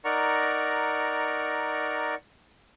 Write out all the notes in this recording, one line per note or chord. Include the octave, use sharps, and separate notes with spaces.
D#4 A#4 D5 F#5 A#5 C#6